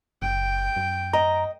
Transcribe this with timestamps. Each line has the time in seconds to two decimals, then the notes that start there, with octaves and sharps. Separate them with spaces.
0.22 F#1 G5
0.76 F#2
1.13 D#5 A#5